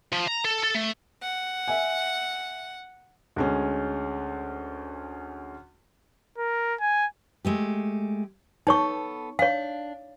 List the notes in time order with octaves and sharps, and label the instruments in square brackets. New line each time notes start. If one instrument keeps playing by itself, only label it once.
[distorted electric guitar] F3
A#5
A4
A4
A3
[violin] F#5
[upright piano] E5 G#5
[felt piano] D2 G#3 C#4
[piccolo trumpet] A#4
G#5
[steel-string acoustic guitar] G#3 A3 G4
[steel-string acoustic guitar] B3 A4 [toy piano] D#4 C#5 C#6
[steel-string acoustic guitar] D4 [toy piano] C#5 F5